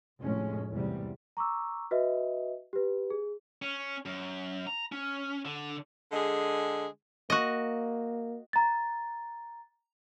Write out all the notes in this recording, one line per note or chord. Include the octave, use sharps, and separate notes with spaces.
F1 A2 G#3 C#4
E2 G#2 C3 G3
A#5 C#6 D6 E6
F#4 B4 D#5 E5
G4 B4
G#4
C#4
F#2
A#5
C#4
D3
D3 G#3 G#4
A#3 F#4 D#5
A#5 A6